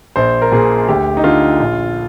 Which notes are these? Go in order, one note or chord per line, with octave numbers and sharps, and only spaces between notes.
A#1 C5
A#4
A#2 G#4
D2 G4
D#4
D3 F4
A#1